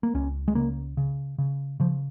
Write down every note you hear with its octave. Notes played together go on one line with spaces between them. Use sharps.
A#3
C#2 C#4
G#3
C#3 A#3
C#3
C#3
C#3 F3